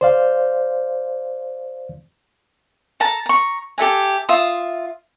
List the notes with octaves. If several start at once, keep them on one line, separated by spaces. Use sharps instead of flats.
C5 D5 F5
A4 A5 A#5
A#5 C#6
G4 A4 E5 G#5
F4 E5 C6 D#6